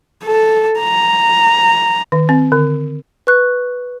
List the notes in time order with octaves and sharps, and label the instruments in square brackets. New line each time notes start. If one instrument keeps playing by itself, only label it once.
[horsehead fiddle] A4
A#5
[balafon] D#3
C4
D3
[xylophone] B4 C#6 F#6